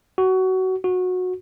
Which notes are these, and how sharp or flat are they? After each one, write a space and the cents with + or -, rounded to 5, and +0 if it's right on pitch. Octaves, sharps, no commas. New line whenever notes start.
F#4 +20
F#4 -20